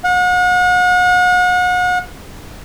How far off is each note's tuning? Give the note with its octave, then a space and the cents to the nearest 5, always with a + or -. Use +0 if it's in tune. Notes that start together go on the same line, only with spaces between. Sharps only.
F#5 -40